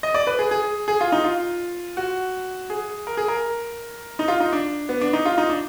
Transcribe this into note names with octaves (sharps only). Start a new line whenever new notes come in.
D#5
D5
B4
G#4
G#4
G#4
F4
D#4
F4
F#4
G#4
A#4
G#4
A#4
D#4
F4
D#4
D4
B3
D4
D#4
F4
D#4
D4